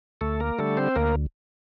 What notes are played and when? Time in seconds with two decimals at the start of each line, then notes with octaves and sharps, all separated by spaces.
0.21 D2 A3 A4
0.40 A#3 A#4
0.59 D3 G3 A3 A4
0.77 C4 C5
0.96 D2 A#3 A#4